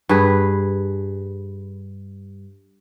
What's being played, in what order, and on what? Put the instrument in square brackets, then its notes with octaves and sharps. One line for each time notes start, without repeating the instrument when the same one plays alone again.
[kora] G2 G#4 B4